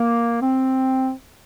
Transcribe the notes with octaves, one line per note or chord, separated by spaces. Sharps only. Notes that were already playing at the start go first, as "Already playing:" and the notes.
Already playing: A#3
C4